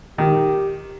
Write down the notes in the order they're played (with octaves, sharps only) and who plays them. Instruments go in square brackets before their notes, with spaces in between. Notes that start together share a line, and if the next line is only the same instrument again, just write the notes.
[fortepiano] D#3 [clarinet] G4